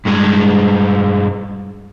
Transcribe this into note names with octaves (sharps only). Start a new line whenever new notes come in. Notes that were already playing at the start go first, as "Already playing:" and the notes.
G2 G#3